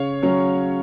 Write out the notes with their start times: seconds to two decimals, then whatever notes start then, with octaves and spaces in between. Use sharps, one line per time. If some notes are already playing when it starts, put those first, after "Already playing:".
Already playing: C#3 C#5 F5
0.22 F#3 C#4